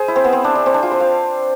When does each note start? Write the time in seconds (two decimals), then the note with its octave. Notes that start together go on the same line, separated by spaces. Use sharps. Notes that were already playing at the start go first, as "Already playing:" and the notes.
Already playing: G#4 C5
0.08 E4
0.16 C4
0.24 B3
0.33 C4
0.44 D4
0.55 D4
0.66 C4
0.74 D4
0.83 F4
0.91 C5
1.00 F5